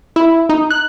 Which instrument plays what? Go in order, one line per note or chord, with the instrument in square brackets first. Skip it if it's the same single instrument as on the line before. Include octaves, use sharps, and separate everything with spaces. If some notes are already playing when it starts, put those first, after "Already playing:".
[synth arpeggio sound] E4
D#4
F#6